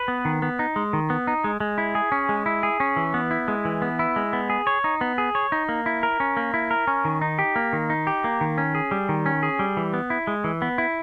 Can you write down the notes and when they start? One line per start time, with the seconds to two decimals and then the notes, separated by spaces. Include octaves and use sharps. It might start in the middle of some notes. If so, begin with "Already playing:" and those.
Already playing: B4
0.08 B3
0.25 D#3
0.42 B3
0.59 D#4
0.76 G#3
0.93 D#3
1.10 B3
1.27 D#4
1.44 G#3
1.60 G#3
1.78 E4
1.95 G#4
2.12 C#4
2.29 G#3
2.46 E4
2.63 G#4
2.80 C#4
2.96 E3
3.14 B3
3.31 E4
3.48 G#3
3.65 E3
3.82 B3
3.99 E4
4.16 G#3
4.33 B3
4.50 G#4
4.67 C#5
4.84 D#4
5.01 B3
5.18 G#4
5.35 C#5
5.52 D#4
5.69 A#3
5.86 E4
6.03 A#4
6.20 C#4
6.37 A#3
6.54 E4
6.71 A#4
6.88 C#4
7.05 D#3
7.21 D#4
7.39 G4
7.56 A#3
7.73 D#3
7.90 D#4
8.07 G4
8.24 A#3
8.41 D#3
8.58 C#4
8.75 G#4
8.91 G3
9.09 D#3
9.26 C#4
9.43 G#4
9.59 G3
9.77 E3
9.94 B3
10.10 E4
10.27 G#3
10.44 E3
10.62 B3
10.78 E4